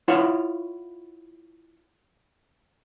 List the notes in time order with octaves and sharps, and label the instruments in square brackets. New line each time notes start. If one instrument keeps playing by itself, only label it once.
[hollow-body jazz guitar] E4 F4 C#5 F5 F#5